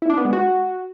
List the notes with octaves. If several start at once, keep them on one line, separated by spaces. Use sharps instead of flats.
E4
D4
B3
G#3
F#4